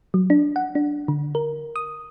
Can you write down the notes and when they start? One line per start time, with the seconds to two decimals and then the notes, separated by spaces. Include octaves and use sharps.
0.14 F#3
0.30 D4
0.56 F#5
0.75 D4
1.08 D3
1.35 A#4
1.76 D#6